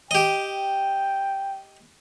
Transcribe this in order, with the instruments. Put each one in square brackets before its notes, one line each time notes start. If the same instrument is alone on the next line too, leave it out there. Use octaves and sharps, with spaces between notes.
[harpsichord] G4 D#5 [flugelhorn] G5